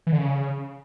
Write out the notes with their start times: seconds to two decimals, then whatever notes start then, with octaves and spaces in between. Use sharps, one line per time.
0.07 E3
0.12 D3
0.18 C#3